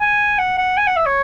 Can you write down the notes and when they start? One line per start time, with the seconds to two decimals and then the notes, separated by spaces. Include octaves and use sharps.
0.01 G#5
0.39 F#5
0.58 F#5
0.77 G#5
0.87 F#5
0.96 E5
1.06 C#5